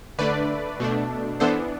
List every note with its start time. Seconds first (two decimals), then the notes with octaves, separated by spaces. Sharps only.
0.19 D3 A3 D4 B4 D5
0.80 B2 A3 D4
1.40 E3 B3 D4 A4 C5